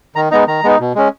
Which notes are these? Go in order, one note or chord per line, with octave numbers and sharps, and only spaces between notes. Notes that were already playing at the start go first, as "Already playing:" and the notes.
D#3 A#5
G#3 B3 D#4 A#5
D#3 A#5
G#3 B3 D#4
B2
G#3 C#4